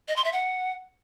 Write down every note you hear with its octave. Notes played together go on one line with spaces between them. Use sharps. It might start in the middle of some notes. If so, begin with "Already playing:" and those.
D#5
C6
E5
F#5